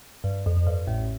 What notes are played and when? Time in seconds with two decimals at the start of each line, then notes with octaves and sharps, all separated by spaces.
0.24 G2
0.46 F2
0.57 F2
0.67 G2
0.87 A1 A2